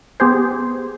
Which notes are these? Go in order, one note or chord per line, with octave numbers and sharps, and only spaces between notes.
B3 G4 G#4 C5